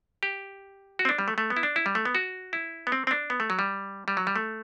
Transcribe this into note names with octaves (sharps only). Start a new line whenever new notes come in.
G4
F#4
C4
D4
G3
A3
A3
B3
E4
D4
E4
G3
A3
B3
F#4
E4
B3
C4
C4
D4
B3
A3
F#3
G3
G3
F#3
G3
A3